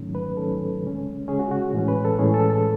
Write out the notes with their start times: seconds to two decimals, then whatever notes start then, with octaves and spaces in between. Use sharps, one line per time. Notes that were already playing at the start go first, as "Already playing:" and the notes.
Already playing: G#2 D#3 F#3 A3 C#4
0.15 B4
0.37 G#2 D#3 F#3 A3 C#4 A4
0.83 C#3 G#3 C#4
1.28 C#3 G#3 C#4 G#4
1.39 F#4
1.51 F#4
1.73 A2 E3 G#3 C#4
1.88 B4
2.05 A4
2.19 A2 E3 G#3 C#4 G#4
2.34 A4
2.50 A4